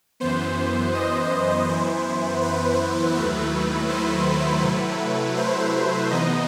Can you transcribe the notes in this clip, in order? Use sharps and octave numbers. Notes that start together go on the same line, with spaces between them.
F#2 E3 B3 C5
D#5
F#2 E3 B3 E4 C5
B4
D#2 D#3 F#3 A3 E4 B4
C5
C3 F#3 A3 E4 B4
C5
C3 E3 B3 D#4 D#5